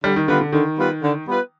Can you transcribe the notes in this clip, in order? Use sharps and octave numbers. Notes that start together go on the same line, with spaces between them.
D3 G3
D#3
D3 G3 B3 F4 B4
D3
D3 D#3
G3 B3 F4 B4
D3
G3 B3 F4 B4